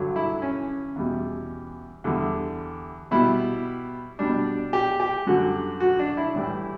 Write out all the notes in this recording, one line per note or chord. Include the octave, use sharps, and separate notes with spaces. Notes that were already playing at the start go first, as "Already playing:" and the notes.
Already playing: G2 D3 F#3
E4
C#4
E2 B2 G3
E2 D3 G3
B2 G3 E4
B2 G3 D4
G4
G4
F#2 D3 G3 F#4
F#4
D4
E4
A2 E3 G3